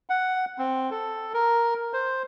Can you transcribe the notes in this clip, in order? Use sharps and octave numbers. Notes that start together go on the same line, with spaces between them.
F#5
C4
A4
A#4
C5